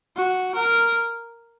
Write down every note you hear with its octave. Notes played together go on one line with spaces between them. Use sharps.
F#4
A#4